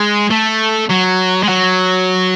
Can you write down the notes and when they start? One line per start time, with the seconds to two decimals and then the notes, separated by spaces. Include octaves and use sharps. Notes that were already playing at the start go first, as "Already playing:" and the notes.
Already playing: G#3
0.31 A3
0.90 F#3
1.43 G#3
1.49 F#3